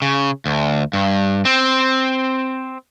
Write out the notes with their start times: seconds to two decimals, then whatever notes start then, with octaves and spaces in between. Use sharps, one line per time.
0.02 C#3
0.46 D2
0.93 G2
1.45 C4